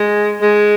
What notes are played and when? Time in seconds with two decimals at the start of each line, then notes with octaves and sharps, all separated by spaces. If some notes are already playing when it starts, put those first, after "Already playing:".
Already playing: G#3
0.41 G#3